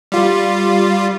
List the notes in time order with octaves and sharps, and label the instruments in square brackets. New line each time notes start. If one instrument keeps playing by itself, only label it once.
[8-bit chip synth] G3 F4